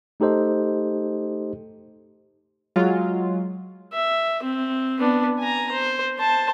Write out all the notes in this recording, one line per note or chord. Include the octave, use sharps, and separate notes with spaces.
A3 D#4 G4 A4 C5 D#5
F#3 G#3 F4
E5
C4
B3 D4
G#5 A#5
C5
C5 A5